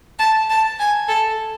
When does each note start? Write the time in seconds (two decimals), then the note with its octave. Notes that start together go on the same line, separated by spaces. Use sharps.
0.19 A5
0.50 A5
0.79 G#5
1.08 A4